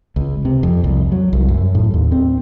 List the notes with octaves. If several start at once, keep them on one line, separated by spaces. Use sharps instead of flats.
C#2
C3
F2
C2
F#3
C2
F#2
A2
D#2
C4